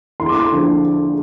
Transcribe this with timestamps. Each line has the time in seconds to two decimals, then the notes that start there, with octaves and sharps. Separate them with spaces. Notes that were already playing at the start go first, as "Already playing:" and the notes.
0.20 E2 C6
0.29 D6
0.40 C6
0.51 D3 F3